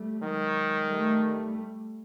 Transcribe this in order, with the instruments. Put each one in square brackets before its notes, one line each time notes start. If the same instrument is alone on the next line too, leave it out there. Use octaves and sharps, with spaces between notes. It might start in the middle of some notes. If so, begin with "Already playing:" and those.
Already playing: [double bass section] G3 A3
[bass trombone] D#3 [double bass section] F#3 G#3
[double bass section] G3 A3